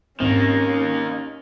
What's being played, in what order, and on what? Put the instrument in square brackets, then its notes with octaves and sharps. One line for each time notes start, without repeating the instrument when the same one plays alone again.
[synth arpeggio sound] G#2 C4 [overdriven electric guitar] D#3 A#3 [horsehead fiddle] C#4